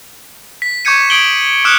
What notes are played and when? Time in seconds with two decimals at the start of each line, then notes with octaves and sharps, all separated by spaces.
0.62 B6
0.85 C#6 D6 G6 G#6 C#7 D#7
1.10 C#6 D#6 G#6 D7 F#7 G7
1.65 D6 D#6 F6 F#6 C#7 E7